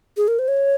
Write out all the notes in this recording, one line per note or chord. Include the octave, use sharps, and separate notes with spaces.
G#4
A#4
C5
C#5